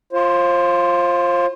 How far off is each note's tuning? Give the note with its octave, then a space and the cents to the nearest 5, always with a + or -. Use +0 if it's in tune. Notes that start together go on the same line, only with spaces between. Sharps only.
F4 +0 C5 +35